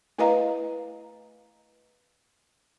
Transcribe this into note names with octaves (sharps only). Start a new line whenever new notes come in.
A3 E4 B4 D#5 F5 A#5